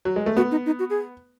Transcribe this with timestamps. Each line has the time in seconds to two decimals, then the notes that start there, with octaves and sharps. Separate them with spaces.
0.05 F#3
0.16 G#3
0.26 A3
0.37 B3 F#4
0.51 D#4
0.66 D#4
0.79 F#4
0.90 G#4